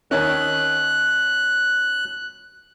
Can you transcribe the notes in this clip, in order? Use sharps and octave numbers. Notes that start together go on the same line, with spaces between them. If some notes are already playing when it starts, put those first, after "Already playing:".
D#2 D#3 C#4 F#6